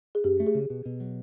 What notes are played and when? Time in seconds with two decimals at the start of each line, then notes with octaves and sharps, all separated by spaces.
0.15 G#4
0.24 F#2 G4
0.40 A3
0.47 G#4
0.55 C#3
0.70 B2
0.85 B2
1.00 F#3